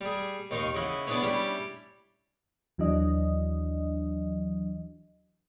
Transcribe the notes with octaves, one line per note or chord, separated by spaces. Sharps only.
G3 G#4
D#2 D#3 D#4 D#5 F5 C#6
C#3 E4 D#5 E5 F#5
B3 D4 E4 G#4 B4 C#5
G3 C#4 D4 E4 G4
D#2 E3 F#3 D4 D#5